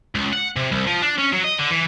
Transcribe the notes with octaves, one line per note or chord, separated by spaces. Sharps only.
C#2
F#5
C3
C2
F3
D4
C#4
F#3
D#5
D3
E3